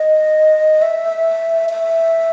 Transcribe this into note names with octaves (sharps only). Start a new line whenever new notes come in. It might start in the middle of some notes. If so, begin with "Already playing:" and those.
Already playing: D#5
E5
E5